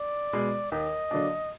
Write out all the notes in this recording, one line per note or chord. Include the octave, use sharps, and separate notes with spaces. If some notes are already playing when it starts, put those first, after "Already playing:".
Already playing: D5
B2 G#3
D#2 D#5
D3 F#3 A#3 D4